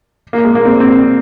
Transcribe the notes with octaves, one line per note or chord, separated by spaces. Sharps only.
A#3
G#3
A#3
C4
C4